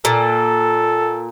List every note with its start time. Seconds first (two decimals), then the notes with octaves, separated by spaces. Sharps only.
0.05 A#2 A4